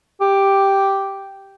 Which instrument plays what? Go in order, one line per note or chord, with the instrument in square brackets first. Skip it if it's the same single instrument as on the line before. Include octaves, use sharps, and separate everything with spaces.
[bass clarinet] G4